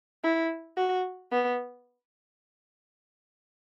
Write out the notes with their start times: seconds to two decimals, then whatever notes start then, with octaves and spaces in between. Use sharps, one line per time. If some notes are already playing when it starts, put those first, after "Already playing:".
0.24 E4
0.77 F#4
1.31 B3